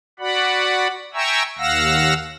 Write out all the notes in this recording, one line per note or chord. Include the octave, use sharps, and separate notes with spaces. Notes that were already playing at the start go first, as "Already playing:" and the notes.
F#4 D5 F#5 B5
E5 G5 G#5 A#5 C#6 E6
D#2 F5 F#5 E6 A#6